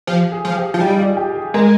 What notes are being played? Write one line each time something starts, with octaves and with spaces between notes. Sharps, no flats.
F3 G4
G#4
F3
G4
F3
G3 D#4
F4
G4
G#4
G#3 A#4